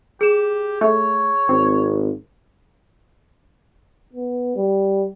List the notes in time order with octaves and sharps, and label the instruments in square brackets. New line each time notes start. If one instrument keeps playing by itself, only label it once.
[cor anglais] G4 [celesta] G#4 E7
[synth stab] A3 [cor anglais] C#5
[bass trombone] G#1 [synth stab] C4
[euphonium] B3
G3